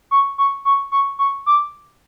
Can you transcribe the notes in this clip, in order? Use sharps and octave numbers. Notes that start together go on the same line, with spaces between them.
C#6
C#6
C#6
C#6
C#6
D6